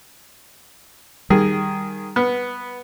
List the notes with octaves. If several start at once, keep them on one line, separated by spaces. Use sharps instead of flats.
D#3 G3 G#4
B3